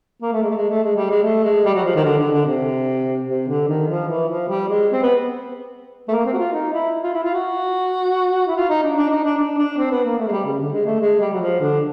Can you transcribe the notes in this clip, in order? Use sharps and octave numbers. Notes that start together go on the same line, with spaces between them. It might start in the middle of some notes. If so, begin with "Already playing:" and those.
A#3
A3
G#3
A3
G#3
A3
G#3
G3
G#3
A3
G#3
G3
F#3
F3
D#3
D3
D3
D3
C3
C3
D3
D#3
F3
E3
F3
G3
G#3
C4
B3
A3
A#3
C4
F#4
F4
D#4
E4
F4
E4
F4
F#4
E4
F4
D#4
D4
D4
D#4
D4
D4
D4
C4
B3
A#3
A3
G#3
G3
C#3
D3
G#3
A3
G#3
G3
F#3
F3
D3